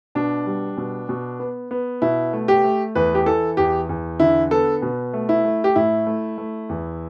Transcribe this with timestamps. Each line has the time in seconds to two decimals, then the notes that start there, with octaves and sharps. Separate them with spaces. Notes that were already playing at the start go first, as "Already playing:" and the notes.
0.15 B2 D4
0.46 G3
0.77 B2
1.09 B2
1.39 B3
1.71 B3
2.02 B2 E4
2.33 A3
2.48 G4
2.64 A3
2.95 E2 B4
3.15 G4
3.26 E3 A4
3.57 E2 G4
3.89 E2
4.20 D3 E4
4.51 B3 A4
4.82 B2
5.14 A3
5.29 E4
5.45 A3
5.64 G4
5.76 A2 E4
6.07 A3
6.38 A3
6.69 E2